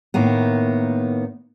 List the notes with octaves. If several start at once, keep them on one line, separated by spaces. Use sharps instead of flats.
A2 D#3 A#3 B3